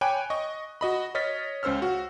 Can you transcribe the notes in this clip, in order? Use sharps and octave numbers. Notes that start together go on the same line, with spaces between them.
C#5 G5 G#5 B5 D6 F#6
D#5 C#6
F#4 D#5 B5
C#5 D#5 F6 A6 B6
C#2 C#4 C5 E6 F6
F#4